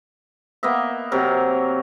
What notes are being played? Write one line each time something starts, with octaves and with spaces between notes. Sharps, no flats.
A#3 B3 D#5 E5
C3 F#3 A#4